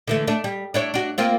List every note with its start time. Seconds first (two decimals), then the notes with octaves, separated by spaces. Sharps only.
0.08 D3 E3 A3
0.27 A3 D4
0.44 G3
0.74 D4 E4 C#5
0.94 D4 F#4
1.18 A#3 C4 F4